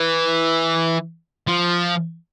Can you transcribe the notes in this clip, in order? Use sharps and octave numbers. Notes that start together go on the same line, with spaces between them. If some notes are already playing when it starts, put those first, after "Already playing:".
Already playing: E3
F3